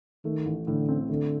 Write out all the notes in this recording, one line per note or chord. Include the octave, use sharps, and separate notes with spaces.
D#3 A3
A1
A2 D3
C4
D3 A3